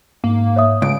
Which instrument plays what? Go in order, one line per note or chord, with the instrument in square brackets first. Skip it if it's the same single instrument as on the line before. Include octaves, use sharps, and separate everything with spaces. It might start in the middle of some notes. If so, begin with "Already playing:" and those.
[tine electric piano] G#2 [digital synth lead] A#3
[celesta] C#5 E5 D#6
[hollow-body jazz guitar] C#2 [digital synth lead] D7